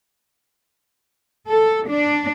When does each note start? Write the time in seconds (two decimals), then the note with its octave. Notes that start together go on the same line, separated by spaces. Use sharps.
1.48 A4
1.88 D4